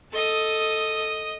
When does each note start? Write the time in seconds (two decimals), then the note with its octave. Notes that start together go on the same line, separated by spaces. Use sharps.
0.13 A4 D#5 D#6